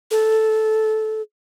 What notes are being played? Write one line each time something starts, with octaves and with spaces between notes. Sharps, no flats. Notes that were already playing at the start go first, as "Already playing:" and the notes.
A4